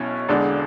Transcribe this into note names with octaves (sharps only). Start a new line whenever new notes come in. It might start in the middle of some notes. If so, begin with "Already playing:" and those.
Already playing: B1 B2 C#4 E4
E1 E2 D3 G#3 D4